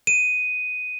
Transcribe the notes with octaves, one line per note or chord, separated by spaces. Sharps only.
D#7